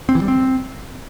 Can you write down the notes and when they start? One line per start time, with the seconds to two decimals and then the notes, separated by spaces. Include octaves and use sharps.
0.09 C4
0.15 E3
0.22 G3
0.28 C4